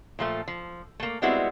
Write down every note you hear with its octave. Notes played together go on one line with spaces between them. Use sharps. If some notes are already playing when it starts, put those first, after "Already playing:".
A#2 F3 A3
F3
A3 A#3
G3 G#3 B3 C4 E4 F#4